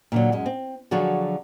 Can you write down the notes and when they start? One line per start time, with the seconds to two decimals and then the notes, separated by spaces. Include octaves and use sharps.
0.12 A#2 D3 F#3
0.32 F#2 G#3
0.46 C4
0.91 D3 F3 F#3 F#4 G#4 A4